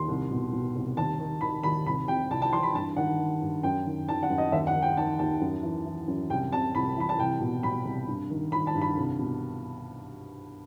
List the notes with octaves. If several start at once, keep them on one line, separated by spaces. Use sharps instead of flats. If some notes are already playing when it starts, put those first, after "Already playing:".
Already playing: D#2 C6
C2
B2
B2
C2
D#2 A5
D#3
D#3 B5
D#2 B5
C2 B5
C3 G5
C2 A5
A5
E3 C6
B5
G2 A5
D#3 F#5
D#3
G2
F#2 G5
D#3
D#3 A5
F#5
F#2
D#5
D#2 E5
F#5
D#3
G5
D#3 A5
D#2 A5
F#2
E3
E3
F#2
C2 G5
C3 A5
C2 B5
E3 B5
A5
C2 G5
B2
B2 B5
C2
G2
D#3
D#3 B5
A5
G2
B5
C2
B2